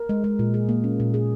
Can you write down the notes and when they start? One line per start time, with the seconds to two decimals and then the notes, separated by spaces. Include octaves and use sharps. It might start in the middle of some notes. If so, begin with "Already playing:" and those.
Already playing: A#4
0.09 G#3
0.24 G#3
0.39 A#2
0.54 G#4
0.69 A#3
0.84 C#4
1.00 A#2
1.14 G#4